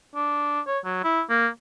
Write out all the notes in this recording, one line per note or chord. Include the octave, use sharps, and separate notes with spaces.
D4
C#5
F#3
E4
A#3